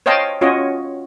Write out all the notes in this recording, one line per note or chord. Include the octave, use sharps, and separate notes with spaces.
C5 C#5 D#5 F5 G5 A5
C#4 F4 F#4 C#5 D#5